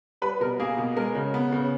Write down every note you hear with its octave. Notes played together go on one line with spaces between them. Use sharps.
G3 B4
B2 A#4
A#3 G#4
B2
G#3 A#4
C#3
B3
C#3